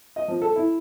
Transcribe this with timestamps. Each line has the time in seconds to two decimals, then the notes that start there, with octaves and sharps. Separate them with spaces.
0.16 D#5
0.28 F3
0.42 A4
0.56 E4